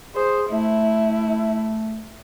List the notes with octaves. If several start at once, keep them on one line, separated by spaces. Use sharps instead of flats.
G#4 C5
A3 E4